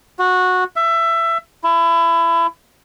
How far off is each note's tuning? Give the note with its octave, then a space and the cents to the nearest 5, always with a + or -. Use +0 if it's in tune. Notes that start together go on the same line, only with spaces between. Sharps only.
F#4 -15
E5 +20
E4 +25